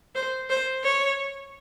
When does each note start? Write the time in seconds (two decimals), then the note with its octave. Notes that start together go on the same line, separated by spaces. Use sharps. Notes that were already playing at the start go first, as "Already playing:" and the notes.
0.15 C5
0.50 C5
0.84 C#5